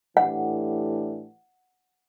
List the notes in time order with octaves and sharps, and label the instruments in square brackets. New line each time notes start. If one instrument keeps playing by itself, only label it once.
[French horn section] A2 E3 A3 D4 G4 [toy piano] F#5